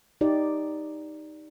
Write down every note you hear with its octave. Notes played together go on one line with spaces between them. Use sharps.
D#4 G4 D5